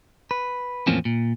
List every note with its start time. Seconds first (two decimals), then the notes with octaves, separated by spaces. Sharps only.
0.31 B4
0.87 E2 A2 F3 A#3 C4 C#4
1.05 A#2